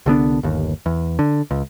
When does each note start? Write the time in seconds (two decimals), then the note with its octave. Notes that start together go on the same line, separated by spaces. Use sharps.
0.06 C2 D3 B3 D4
0.43 G1 D#2
0.86 E2
1.19 D3
1.51 C#2